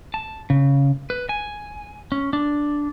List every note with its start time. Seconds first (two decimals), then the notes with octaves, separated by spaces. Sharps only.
0.14 A5
0.50 C#3
1.10 B4
1.29 G#5
2.12 C#4
2.33 D4